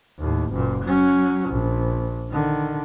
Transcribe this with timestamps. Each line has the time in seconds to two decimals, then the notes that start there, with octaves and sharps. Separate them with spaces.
0.19 D#2 A2
0.52 F#1 A#2
0.84 F#3 C#4
1.49 A#1
2.30 D3 D#3